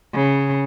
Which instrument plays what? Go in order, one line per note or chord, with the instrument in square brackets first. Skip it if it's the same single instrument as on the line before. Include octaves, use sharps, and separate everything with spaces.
[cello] C#3